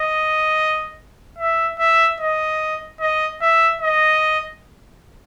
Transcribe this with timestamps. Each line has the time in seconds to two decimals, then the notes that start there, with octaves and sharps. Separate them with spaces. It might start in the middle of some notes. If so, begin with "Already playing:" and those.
Already playing: D#5
1.38 E5
1.79 E5
2.20 D#5
3.00 D#5
3.42 E5
3.82 D#5